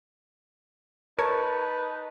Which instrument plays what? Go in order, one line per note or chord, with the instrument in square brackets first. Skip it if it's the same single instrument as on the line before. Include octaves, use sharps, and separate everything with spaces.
[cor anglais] D#4 [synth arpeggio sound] A#4 C#5 [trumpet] B4 [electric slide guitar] A5